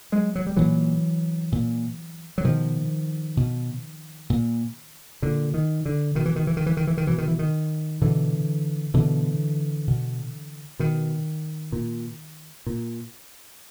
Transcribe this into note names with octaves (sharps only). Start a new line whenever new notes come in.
F#3 G#3
F#3
G3
A#2 E3 F#3
A#2
F#3
B2 D#3 F3
B2
A#2
A#2 D3
D#3
D3
B2 D#3
E3
D#3
E3
D#3
E3
D#3
E3
D#3
B2 E3
D#3
E3
D#3
B2 D3 E3
B2 D3 E3
B2
B2 D#3
A#2
A#2